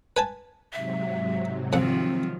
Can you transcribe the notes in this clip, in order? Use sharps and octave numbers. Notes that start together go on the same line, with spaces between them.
B4 G#5 A5
G#2 C3 F#3 E5
F2 D#3 F3 C4 F#5